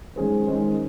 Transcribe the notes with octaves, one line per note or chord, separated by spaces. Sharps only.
D#3 G#3 C#4 G#4 C5
D#3 G#3 C#4 G#4 C5